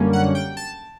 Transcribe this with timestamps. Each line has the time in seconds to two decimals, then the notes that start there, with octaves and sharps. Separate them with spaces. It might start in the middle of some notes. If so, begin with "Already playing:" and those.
Already playing: F#2 D3 G3 A#3 C#4
0.13 F#5
0.35 G5
0.57 A5